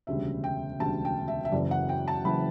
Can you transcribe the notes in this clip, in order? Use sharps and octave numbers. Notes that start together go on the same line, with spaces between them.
E1 D2 C#3 G3 E5
G5
E1 D2 C#3 G3 A5
G5
E5
E5
F#1 F#2 C#3 E3 D5
F#5
G5
A5
F#1 F#2 C#3 E3 B5